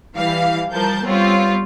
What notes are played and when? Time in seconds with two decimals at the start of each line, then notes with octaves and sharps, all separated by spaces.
0.15 E3 G3 F5
0.73 F3 G3 A#4 A5 G6
1.05 G3 B3 C4 F4 C#5